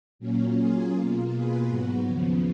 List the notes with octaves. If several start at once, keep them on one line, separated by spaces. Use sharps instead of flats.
A#2 F#3 A#3 C#4
F#3 A#3 C#4 F4 G#4
B2 A#3 F4
B2 A#3 F4 G#4 B4
G#2 F#3 B3 F#4
D#2 C#3 F3 B3